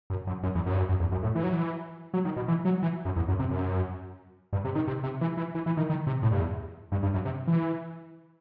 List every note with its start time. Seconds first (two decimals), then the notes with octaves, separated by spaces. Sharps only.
0.10 F#2
0.27 F#2
0.43 F#2
0.55 E2
0.66 F#2
0.74 G2
0.78 F#2
0.89 F#2
1.00 E2
1.12 F#2
1.23 A2
1.35 E3
1.43 F#3
1.53 E3
2.14 F#3
2.25 D#3
2.36 B2
2.48 E3
2.65 F#3
2.83 E3
3.05 F#2
3.16 E2
3.28 F#2
3.39 C3
3.51 F#2
4.53 G2
4.65 C3
4.75 D#3
4.87 C3
5.03 C3
5.21 E3
5.37 E3
5.55 E3
5.66 E3
5.77 D#3
5.90 D#3
6.07 C3
6.22 A2
6.31 G2
6.39 E2
6.92 G2
7.03 G2
7.14 F#2
7.25 C3
7.47 E3